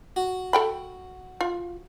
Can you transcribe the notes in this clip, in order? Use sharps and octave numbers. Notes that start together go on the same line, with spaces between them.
F#4
A4 G5 B5
F4